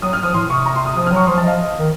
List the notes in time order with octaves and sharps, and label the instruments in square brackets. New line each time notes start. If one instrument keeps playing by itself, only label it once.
[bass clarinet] F#3 [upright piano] D#6
[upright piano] F6
[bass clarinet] F3 [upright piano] D#6
[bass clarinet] A2 [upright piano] C6
[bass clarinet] C3 [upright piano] C#6
[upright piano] A#5
C6
D#6
[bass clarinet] F3 [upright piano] D#6
[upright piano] F6
[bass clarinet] F#3 [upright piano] C#6
[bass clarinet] F3 [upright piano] C6
[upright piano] A5
[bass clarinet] F3 [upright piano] D#5
[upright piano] F5
D#5
[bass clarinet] D#3